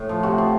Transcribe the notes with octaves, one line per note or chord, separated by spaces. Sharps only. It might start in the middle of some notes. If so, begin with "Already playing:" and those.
Already playing: A2
F3
C3 F#4
F3